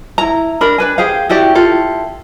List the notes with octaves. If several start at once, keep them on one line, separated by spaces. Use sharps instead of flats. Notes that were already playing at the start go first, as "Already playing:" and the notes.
E4 A#5
D4 A#4 B5
D4 B4 G#5
G4 G#4 C5 F5
E4 F#4 G4 D5
E4 F4 G4 A4